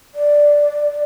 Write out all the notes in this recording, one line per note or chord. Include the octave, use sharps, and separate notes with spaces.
D5